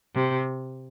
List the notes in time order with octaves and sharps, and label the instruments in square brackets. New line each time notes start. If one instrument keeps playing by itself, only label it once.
[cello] C3